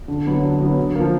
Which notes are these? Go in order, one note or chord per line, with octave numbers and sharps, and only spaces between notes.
D3
F#3 B3
D3
F#3 B3
D3
F3 A#3